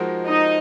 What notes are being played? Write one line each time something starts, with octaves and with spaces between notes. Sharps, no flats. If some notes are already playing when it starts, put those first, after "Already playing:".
Already playing: F3 G#3 D#4 F#4 A#4
D#4 D#5